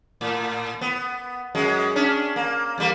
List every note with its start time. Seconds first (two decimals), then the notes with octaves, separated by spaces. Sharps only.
0.21 A2
0.81 B3
1.55 F#2 G#3
1.96 C#4 D4
2.36 A#3
2.78 E2 G3 A#3